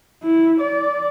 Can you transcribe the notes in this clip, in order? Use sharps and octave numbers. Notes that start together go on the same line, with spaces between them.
E4
D5